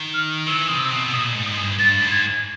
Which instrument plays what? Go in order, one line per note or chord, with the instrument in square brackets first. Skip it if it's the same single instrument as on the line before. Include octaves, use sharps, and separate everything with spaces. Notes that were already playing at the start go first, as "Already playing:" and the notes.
Already playing: [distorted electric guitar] D#3
[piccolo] F6
[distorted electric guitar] E3 [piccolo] E6
[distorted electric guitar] C3 [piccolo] D#6
[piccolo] E6
[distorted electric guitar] B2
[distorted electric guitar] A#2 [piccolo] D#6
[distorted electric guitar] G#2
[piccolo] D#6
[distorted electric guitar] G2
[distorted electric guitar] G2 [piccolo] A6
[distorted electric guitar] G#2
[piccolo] G#6